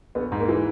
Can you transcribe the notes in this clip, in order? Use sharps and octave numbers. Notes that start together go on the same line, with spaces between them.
A#1 B3
G#2
A#3
E3